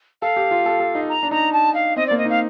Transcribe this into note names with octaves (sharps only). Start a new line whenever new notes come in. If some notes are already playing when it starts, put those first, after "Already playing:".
A4 F5
G4
F4
A4
A4
D#4
A#5
D4
D#4 A#5
A5
F5
C4 D#5
A#3 D5
D#5
D#4 F5